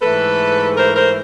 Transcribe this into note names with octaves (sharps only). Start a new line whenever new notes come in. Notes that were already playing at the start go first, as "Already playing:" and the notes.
G#2 E3 A3 A4 B4
A#4 C5
A#4 C5